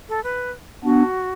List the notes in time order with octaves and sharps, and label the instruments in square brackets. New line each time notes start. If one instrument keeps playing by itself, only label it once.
[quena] A4
B4
[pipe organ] B3 D4 [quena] F#4